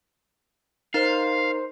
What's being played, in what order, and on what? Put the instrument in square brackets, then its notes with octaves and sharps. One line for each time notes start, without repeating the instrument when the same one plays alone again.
[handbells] D#4 A#4 [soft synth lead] C5 [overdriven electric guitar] F5